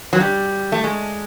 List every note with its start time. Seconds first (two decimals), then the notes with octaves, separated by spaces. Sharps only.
0.13 F#3
0.20 G3
0.72 A3
0.84 G#3